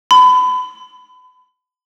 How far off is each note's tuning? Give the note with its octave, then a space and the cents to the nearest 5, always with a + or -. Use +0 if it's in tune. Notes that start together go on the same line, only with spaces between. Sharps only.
B5 +30